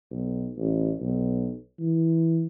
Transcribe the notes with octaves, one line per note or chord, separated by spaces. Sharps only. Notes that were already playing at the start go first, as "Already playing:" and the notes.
B1
A1
B1
E3